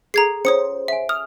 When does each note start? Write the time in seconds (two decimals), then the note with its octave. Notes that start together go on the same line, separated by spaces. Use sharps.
0.14 G#4 A4 A#5 G#6 C7
0.45 C#4 F4 C5 C#5 D#6 C#7
0.88 E5 F#5 G#5
1.09 D#6 F6